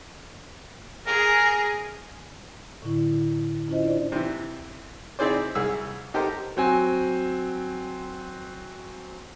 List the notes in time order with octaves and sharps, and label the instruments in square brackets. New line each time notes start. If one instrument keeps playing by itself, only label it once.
[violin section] G#4 [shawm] A#4
[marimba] A2 D3 E4
C#4 E4 F4 C5 D#5
D4 C5 D5
[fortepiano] C3 E3
C4 D#4 E4 G#4 C5 D5
C2 G#4 E6
D#4 G4 A4 A#4 C5
[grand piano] F#3 C4 G#5